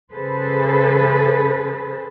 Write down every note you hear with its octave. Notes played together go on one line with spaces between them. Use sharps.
C#3 G#4 A4 B4 C5